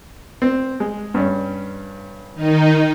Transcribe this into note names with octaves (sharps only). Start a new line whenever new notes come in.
C4
G#3
G2 C#4
D#3 D#4